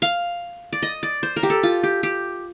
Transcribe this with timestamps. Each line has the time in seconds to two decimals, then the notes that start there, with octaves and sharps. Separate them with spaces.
0.02 F5
0.73 D5
0.83 D#5
1.03 D5
1.23 C5
1.36 A#4
1.43 G4
1.50 A4
1.63 F4
1.83 G4
2.03 G4